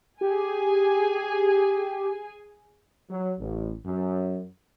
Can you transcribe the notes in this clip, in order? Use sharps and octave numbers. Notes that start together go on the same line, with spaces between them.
G4 G#4 G#5
F#3
A1
F#2